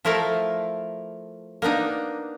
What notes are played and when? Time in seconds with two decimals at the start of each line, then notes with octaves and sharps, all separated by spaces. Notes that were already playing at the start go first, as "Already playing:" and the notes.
0.05 F3 A3 E4 A4 A#4 F5
1.62 A#3 B3 D4 D#4